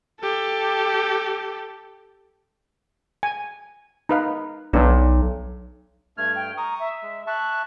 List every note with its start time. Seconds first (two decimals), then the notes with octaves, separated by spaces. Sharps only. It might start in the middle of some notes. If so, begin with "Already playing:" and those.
0.20 G4 A4
3.23 G#5
4.09 D#4 B4 F5
4.73 B1 B3 D4
6.17 G2 A3 F6 G#6
6.35 G5
6.57 A#5 C#6 D#6
6.79 E5
7.02 G#3
7.27 E5 A5 C#6 F#6